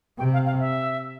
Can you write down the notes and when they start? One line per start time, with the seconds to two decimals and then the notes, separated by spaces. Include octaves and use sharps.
0.19 C3 G5
0.33 F5
0.46 F5
0.60 E5